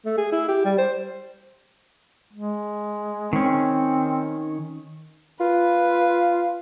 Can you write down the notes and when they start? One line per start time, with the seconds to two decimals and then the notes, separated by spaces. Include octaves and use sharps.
0.05 A3
0.17 G#4
0.32 E4
0.48 G4
0.65 G3
0.78 C5
2.33 G#3
3.33 D#3 C4 C#4
5.40 F4 B4